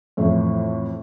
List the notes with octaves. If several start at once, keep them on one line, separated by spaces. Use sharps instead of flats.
F2 A2 E3